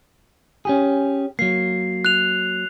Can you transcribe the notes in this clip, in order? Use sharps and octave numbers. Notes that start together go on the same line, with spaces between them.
C#4 G4 G#4
F#3 A#3 C7
F#6 F7